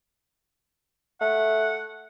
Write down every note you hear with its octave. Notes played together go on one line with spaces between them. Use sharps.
A3 F#5